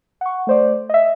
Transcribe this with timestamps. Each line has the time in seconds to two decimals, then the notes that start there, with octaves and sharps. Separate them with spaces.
0.21 F#5 C#6
0.47 A3 C5 D5
0.89 D#5 E5